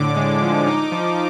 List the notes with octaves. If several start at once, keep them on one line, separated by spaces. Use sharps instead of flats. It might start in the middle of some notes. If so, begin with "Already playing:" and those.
Already playing: A2 D3 D6
G#3
F3
D#4
F3